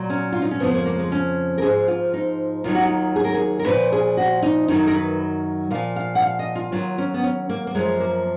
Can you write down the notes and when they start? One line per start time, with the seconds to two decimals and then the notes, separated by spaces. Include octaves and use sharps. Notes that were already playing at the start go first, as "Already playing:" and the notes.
Already playing: A#2 F#3
0.10 C#4
0.32 F4
0.42 D#4
0.51 C#4
0.60 F2 C#3 F3 B3
0.73 A#3
0.86 A#3
0.99 G#3
1.12 C#4
1.58 A#4
1.62 G#2 F3 G#4
1.88 F4
2.14 D#4
2.64 D#2 D#3 F#3 F4
2.75 F#4
2.86 F4
3.16 G#4
3.24 A#4
3.34 G#4
3.59 A#4
3.66 A#2 F3 B4
3.92 G#4
4.17 F#4
4.42 D#4
4.68 F#2 D#3 F#3 D#4
4.87 A#4
4.94 B4
5.70 A#2 F3 F5
5.96 F5
6.15 F#5
6.22 F5
6.39 D#5
6.55 F4
6.72 D#2 D#3 F#3 F4
6.98 C#4
7.14 B3
7.24 C#4
7.49 A#3
7.67 A#3
7.75 F#2 F3 G#3
8.00 A#3